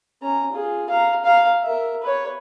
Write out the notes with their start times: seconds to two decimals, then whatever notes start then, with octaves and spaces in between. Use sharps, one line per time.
0.22 C#4 A#5
0.52 F4 G#4
0.90 F5 A#5
1.24 F5 A#5
1.63 A#4 E5
2.03 B4 C#5